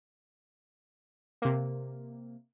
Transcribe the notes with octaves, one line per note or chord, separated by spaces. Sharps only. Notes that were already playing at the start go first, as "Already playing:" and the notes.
C3 A#3